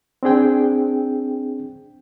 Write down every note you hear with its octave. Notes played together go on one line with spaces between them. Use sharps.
C4 D4 G#4 G5